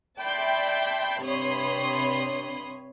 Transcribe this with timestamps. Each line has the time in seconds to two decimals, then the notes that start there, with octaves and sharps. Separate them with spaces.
0.20 D5 E5 G5 A5 B5 C6
1.23 G2 C3 C#5 B5 C6 D#6